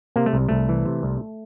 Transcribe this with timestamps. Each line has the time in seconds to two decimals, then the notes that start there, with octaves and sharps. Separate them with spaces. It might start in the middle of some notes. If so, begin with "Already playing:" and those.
0.16 C3 A#3
0.26 A3
0.33 C2
0.49 C2 A3
0.69 E3
0.86 C3
1.03 C2